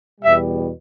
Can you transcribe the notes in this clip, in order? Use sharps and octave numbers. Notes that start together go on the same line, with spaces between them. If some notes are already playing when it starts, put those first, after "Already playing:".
E2 B2 G3 E5